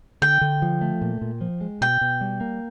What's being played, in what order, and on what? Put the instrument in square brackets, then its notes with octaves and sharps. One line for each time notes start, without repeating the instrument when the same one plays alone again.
[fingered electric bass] D3 [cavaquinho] G5
[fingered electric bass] D3
F3
A3
A#2
A#2
F3
G#3
[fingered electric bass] B2 [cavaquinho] G5
[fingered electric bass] B2
G3
A#3